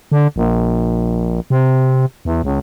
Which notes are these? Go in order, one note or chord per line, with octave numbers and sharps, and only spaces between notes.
D3
A#1
C3
E2
C#2